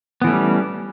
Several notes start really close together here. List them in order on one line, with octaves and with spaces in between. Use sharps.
B3 E3 A3 C#4 G3